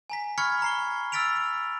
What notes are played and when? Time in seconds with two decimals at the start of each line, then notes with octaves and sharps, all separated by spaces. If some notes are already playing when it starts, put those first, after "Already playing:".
0.10 G#5 A#5 B6
0.38 B5 C#6 F6 G#6 B6 C#7
0.62 A#5 C7 G7
1.12 E6 F6 A6 B6 D7 F7